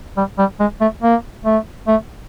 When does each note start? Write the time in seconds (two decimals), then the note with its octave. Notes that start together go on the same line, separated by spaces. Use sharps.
0.17 G3
0.38 G3
0.59 G#3
0.81 A3
1.02 A#3
1.45 A3
1.87 A3